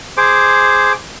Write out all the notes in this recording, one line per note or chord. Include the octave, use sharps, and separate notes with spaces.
G#4 C5 D6